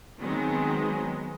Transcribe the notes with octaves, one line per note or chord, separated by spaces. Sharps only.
D#3 F#3 G#3 B3 C4